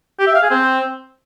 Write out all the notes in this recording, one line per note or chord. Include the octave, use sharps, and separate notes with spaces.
G4
E5
F5
G#4
C4